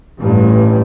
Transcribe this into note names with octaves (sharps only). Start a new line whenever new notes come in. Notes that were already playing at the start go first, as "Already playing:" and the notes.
A1 G2